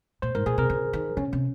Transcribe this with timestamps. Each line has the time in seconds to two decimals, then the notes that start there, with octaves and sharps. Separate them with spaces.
0.22 A#2 C5
0.35 G#2 A#4
0.46 A#2 G#4
0.58 C3 A#4
0.70 C#3
0.93 D#3
1.17 C#3 C#4
1.33 C3